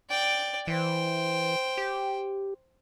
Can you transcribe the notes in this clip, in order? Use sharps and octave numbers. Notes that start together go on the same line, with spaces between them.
D5 G5
E3 C5 G5
G4